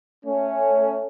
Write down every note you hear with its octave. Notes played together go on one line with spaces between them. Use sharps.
A3 C#4